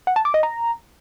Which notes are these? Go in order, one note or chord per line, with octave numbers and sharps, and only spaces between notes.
F#5
A5
D6
D#5
A#5